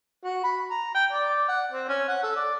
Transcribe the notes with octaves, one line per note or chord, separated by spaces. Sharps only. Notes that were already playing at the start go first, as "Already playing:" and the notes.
F#4
B5
A#5
G5
D5
F#5
C4
C#4
F#5
A4
D5